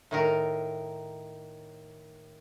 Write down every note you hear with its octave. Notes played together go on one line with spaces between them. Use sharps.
A2 D#3 A#4